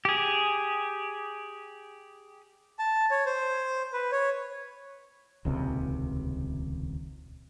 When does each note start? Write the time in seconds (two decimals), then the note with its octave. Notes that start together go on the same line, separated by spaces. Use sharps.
0.05 G4 G#4
2.79 A5
3.11 C#5
3.26 C5
3.93 B4
4.12 C#5
5.45 D#1 C#2 C3